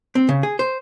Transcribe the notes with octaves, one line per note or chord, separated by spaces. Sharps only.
C4
C#3
G#4
C5